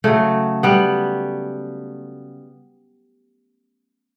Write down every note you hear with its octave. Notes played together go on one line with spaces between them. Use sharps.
C#3 F#3 A3
G3 B3